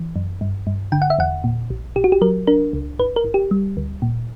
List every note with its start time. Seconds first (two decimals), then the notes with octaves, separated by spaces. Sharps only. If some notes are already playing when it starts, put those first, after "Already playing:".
Already playing: E3
0.16 F#2
0.41 G2
0.67 G2
0.92 D3 G5
1.02 F#5
1.10 E5
1.18 E2 F#5
1.44 A#2
1.70 A#1
1.96 A#1 G4
2.04 F#4
2.12 G4
2.21 F#3 A#4
2.47 D4 A#4
2.73 C#2
2.99 G1 B4
3.16 A#4
3.24 G1
3.34 G4
3.51 G3
3.77 D2
4.02 A#2